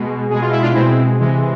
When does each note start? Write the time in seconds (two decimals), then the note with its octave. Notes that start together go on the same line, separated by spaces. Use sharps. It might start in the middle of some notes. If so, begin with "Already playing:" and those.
Already playing: B2 G#3
0.30 B2 G#3 G#4
0.41 F4
0.51 E4
0.62 D4 F4
0.74 B2 G#3 C4 E4
1.20 C3 E3 G#3